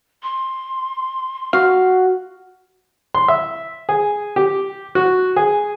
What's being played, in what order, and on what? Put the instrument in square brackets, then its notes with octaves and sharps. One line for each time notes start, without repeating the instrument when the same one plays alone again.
[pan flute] C6
[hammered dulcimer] F#4 [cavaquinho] F5
[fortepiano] C6
E5
G#4
G4
F#4
G#4